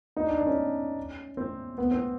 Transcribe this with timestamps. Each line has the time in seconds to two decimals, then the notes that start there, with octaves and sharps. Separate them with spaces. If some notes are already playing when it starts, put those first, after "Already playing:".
0.16 D#4
0.27 D4
0.37 D4
0.47 C#4
1.37 C4
1.78 B3
1.91 C4